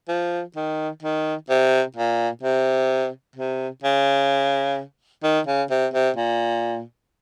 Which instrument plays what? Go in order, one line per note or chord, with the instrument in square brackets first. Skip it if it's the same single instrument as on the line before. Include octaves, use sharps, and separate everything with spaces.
[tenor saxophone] F3
D#3
D#3
C3
A#2
C3
C3
C#3
D#3
C#3
C3
C3
A#2